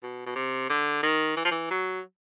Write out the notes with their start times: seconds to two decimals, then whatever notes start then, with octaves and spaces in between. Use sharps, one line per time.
0.03 B2
0.26 B2
0.35 C3
0.70 D3
1.03 D#3
1.36 E3
1.45 F3
1.51 E3
1.70 F#3